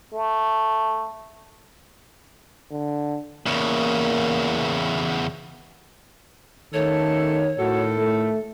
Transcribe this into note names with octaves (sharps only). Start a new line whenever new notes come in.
A3
D3
E2 C#3 A#3
D#3 A3 C#4 A4 C#5
A2 D#3 E4 F#4 A4
A3